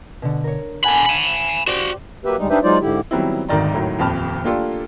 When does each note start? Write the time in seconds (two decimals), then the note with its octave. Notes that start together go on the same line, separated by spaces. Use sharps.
0.22 B2 D3
0.44 A#4 C#5
0.84 D3 F#5 G#5 A5 B5
1.06 G#5 B5 C#7
1.48 C7
1.67 F#4 G4 C5 D5 G5
2.25 F#3 A#3 G4 B4 E5
2.38 D2 G3 G#3 D#4
2.50 D4 D#4 G4 B4 C5 E5
2.64 F#3 G#3 D#4 F4 C5 D5
2.81 G#2 D3 E4 G4
3.11 D#3 F#3 G3 B3 C4 E4
3.49 G#1 D2 G#2 D#3 D5 A#5
3.74 D#2 A2 D#3 F#3
3.99 D#1 F2 G5 A5 B5 F6
4.44 A3 A#3 D4 F4 G4 A4